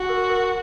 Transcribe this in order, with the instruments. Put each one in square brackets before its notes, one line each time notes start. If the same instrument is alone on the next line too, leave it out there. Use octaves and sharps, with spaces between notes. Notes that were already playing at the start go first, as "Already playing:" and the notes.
Already playing: [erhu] F#4
[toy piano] A#4
A#4